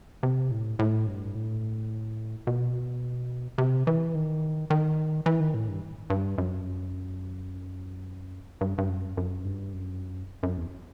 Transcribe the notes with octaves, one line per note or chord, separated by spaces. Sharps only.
C3
A2
A2
G2
A2
B2
C3
E3
D#3
D#3
E3
D#3
A2
G2
G2
F#2
G2
G2
F#2
F#2
G2
F#2
F#2
E2